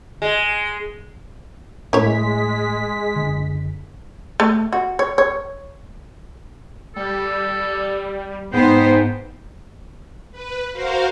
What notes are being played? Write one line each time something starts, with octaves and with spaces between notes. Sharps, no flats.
G#3
A2 G#3 E4 C#5 B6
F#1 D3
A3
F#4
C#5
C#5
G3 A4
G#2 B3 D#4 C5 G5
B4
F#4 A#4 C5 F5